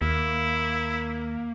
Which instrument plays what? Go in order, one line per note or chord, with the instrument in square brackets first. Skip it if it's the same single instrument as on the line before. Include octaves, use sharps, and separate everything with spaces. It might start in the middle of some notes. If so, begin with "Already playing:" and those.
[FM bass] D#2 [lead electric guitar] A#3 [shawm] E4